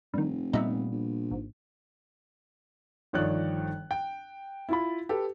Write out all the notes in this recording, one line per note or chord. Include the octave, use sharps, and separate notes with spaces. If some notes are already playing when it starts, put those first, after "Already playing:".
F1 G2 D#3
A#2 G3 B3 D#4 E5
A#1
G#1
G1 D#3 F3 C#5 D5 F#6
G5
E4 F4 B5
G4 A4 B4